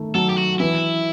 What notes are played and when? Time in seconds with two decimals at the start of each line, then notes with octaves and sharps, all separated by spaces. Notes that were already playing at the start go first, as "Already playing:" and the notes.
Already playing: D#3 A3
0.14 F#3 A4
0.30 G4
0.38 F#4
0.60 E3 E4